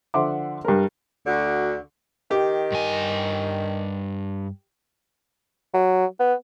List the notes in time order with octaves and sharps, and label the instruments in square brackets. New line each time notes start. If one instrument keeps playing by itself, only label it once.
[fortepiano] D3 F3 E5 F#5 C6 D6
G2 A#4
[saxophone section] D2 D3 F#4
[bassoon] D#3 [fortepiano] G4
[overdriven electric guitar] G2 G#5
[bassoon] F#3
B3